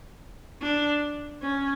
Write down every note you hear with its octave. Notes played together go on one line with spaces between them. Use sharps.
D4
C#4